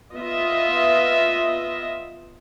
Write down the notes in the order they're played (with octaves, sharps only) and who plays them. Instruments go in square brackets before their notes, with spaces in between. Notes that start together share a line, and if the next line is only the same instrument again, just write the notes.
[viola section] B3 F4 D#5 E5